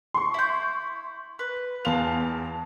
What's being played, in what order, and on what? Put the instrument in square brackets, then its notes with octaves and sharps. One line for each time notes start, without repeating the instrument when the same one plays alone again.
[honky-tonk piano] C6 C#6
[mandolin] E4 G6
B4
[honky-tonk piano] E2 F7 [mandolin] F4 A5